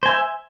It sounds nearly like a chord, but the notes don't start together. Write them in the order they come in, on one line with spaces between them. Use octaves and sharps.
C5 G#5 E5